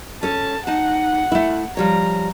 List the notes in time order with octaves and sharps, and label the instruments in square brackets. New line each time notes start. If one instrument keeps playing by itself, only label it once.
[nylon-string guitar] C#4 A4 [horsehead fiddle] A5
[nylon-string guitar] D#4 A5 [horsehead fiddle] F#5
[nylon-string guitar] A3 E4
[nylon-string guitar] F3 G3 C#5 [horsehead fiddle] A#5